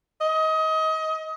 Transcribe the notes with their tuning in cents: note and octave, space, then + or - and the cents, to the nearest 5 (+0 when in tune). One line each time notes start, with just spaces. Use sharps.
D#5 +25